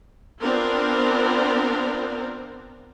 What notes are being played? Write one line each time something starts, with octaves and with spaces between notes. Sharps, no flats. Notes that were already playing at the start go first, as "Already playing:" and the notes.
B3 C4 D4 F4 A#4 C5